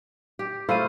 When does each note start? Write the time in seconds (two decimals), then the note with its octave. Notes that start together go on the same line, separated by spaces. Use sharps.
0.39 G4
0.69 A3 E4 F4 C5 F5 D#7